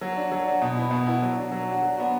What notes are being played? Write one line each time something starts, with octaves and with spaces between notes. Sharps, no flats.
F#3
D4 F#4
F#3
D4 F#4
B2
B3 E4
B2
B3 E4
F#3
D4 F#4
F#3
D4 F#4
F#3
B3 D4 F#4